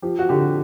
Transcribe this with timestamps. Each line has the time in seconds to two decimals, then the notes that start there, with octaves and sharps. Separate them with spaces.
0.02 F3 G4
0.19 F#4
0.29 D3 G4